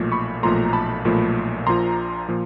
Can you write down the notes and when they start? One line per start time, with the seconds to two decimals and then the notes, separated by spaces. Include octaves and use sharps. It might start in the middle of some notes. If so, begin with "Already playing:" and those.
Already playing: B1 A#2 F3 A3
0.12 B5 C#6
0.43 B1 A#2 F3 A3 A#5 C6
0.73 A5 B5
1.05 B1 A#2 F3 A3
1.66 A#1 A#2 F3 A#5 C6
2.29 A#2 F3